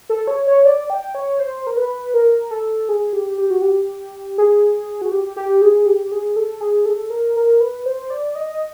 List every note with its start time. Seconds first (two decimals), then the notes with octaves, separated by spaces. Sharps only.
0.10 A4
0.27 C#5
0.47 C#5
0.65 D5
0.90 G5
1.15 C#5
1.39 C5
1.67 A#4
1.77 B4
2.14 A#4
2.51 A4
2.89 G#4
3.13 G4
3.38 G4
3.50 F#4
3.62 G4
4.38 G#4
5.02 F#4
5.12 G4
5.36 G4
5.61 G#4
5.86 G4
6.11 G#4
6.36 A4
6.61 G#4
6.86 A4
7.10 A#4
7.36 A#4
7.61 B4
7.86 C5
8.10 D5
8.35 D#5